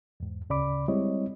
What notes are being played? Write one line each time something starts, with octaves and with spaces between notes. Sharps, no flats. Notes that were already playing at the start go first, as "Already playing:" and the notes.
E2 G#2
D2 C#3 D5 B5 D6
G3 G#3 C4 E4 C#5 D#5